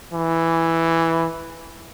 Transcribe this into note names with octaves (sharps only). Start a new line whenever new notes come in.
E3